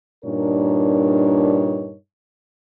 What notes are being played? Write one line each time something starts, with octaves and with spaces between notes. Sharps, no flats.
G2 A#2 D4 D#4 A#4 C#5